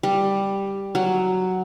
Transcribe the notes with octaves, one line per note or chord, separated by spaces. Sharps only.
G3
F#3